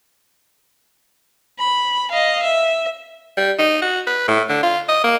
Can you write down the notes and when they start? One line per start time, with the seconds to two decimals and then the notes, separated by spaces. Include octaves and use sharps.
1.59 B5
2.11 D#5 F5
2.43 E5
3.37 G3
3.58 D#4
3.81 F#4
4.07 B4
4.28 A2
4.49 D3
4.63 F4
4.89 D#5
5.04 A#3